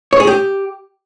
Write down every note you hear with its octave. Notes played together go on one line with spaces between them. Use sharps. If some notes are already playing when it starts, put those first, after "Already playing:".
C#5
G#4
G4